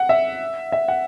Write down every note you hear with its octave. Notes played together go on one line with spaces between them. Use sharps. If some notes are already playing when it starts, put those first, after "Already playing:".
Already playing: F#5
E5
E5
F#5